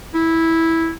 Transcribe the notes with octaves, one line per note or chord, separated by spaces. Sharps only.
E4